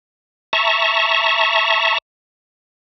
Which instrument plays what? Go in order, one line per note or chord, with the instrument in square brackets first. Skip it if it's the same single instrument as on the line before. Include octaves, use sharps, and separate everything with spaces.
[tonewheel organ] E5 A5 A#5 C#6